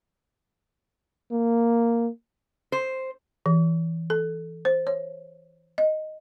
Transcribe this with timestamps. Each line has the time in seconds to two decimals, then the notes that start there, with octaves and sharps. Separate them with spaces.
1.32 A#3
2.72 C5
3.46 E3
4.10 A4
4.65 C5
4.87 C#5
5.78 D#5